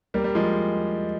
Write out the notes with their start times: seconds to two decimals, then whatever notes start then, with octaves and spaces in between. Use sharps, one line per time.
0.14 G3 A#3
0.24 G3
0.35 F3 G#3